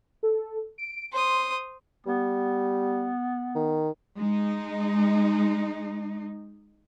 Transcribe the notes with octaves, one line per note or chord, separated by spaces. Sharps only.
A4
D7
C5 C6 D#6
G3 B3
D#3
G#3 D#4